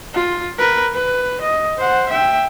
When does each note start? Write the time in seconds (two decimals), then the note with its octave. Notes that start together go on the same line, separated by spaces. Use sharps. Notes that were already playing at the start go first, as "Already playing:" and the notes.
0.14 F4
0.58 A#4 B4
0.94 B4
1.41 D#5
1.78 C5 F#5
2.09 E5 G5